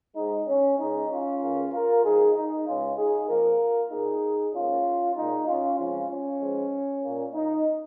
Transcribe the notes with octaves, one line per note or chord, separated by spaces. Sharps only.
G#2 G#3 D#4
C#4
C#2 C#3 G#3 D#4
C#4 F4
C#2 C#3 A#3
F4 A#4
G#2 F3 G#3 D#4 G#4
D#4
C#2 C#3 G#3 C#4 F4
D#4 G#4
F2 F3 A#3 F4 A#4
A#2 A#3 D#4 G#4
G#2 D#3 A#3 C#4 F4
A#2 G#3 D#4
C#4 F4
F2 C#3 F3 G#3 C#4 F4
C#4
G#2 F3 G#3
A#2 A#3
D#4